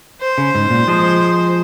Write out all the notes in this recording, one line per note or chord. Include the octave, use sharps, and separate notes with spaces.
C5
C#3
G#2
A#2
F3 G#3